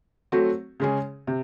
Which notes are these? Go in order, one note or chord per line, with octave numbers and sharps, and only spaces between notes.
F#3 A3 C4 F#4
C#3 G#3 C#4 G#4
C3